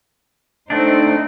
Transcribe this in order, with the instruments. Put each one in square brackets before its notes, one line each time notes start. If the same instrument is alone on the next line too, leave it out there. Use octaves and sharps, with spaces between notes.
[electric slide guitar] A3 C4 D4 [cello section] D#4 C5